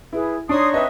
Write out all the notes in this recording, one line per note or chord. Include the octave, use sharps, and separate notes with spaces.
E4 G#4 B4
D4 D#4 C#5 C6 C#6 D#6
C4 D4 B4 D#5 E5 D#6